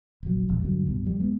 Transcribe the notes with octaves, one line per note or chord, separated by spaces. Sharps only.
F1 A#1 F#3
E1 A#1 F2
G2 D3 F#3
C2 G2 B2
F2 G3
G#3 B3